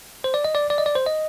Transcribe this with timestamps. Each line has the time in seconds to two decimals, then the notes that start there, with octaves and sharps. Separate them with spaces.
0.24 C5
0.34 D5
0.45 D#5
0.55 D5
0.70 D5
0.78 D#5
0.86 D5
0.96 C5
1.06 D#5